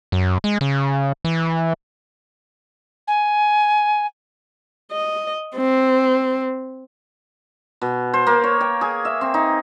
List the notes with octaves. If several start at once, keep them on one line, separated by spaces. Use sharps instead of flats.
F#2
G#3
C#3
E3
G#5
D#5
C4
B2
C5
A#3
C#5
G5
G#4
E5
C4
D#4